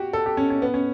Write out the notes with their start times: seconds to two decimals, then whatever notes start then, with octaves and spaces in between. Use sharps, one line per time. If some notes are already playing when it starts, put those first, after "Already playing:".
Already playing: F#4 G4
0.13 A4
0.26 G4
0.37 C#4
0.50 C#4
0.62 B3
0.74 C#4